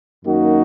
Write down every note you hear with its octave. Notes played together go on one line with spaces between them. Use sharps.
F#2 D#3 A#3 D#4 F#4